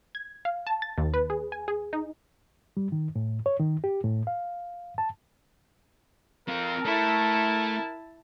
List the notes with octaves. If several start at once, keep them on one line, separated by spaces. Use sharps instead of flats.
G#6
F5
A5
A6
D#2
B4
G#4
G#5
G#4
D#4
G3
D#3
A2
C#5
D#3
G4
A2
F5
A5
C4 F4 A#4
A3 E4 A5